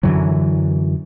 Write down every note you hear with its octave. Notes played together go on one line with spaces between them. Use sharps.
F#2 D3 E3 F#3